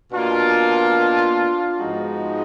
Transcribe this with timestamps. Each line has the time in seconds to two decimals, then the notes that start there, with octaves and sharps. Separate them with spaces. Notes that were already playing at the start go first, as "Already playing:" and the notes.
0.12 B2 A#3 D4 F4
1.79 G#2 F3 G#3 B3 D#4 F#4